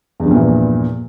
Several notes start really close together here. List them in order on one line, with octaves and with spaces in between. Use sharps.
E2 G2 F3 A#2 E3